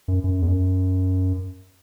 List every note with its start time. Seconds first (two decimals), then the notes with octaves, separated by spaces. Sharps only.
0.08 F#2
0.24 F#2
0.42 E2
0.48 F#2